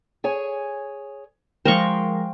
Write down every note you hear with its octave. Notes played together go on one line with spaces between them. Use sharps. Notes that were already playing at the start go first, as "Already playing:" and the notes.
G#4 C#5 G#5
F3 G#3 A#4 C5 F5 G5 C#6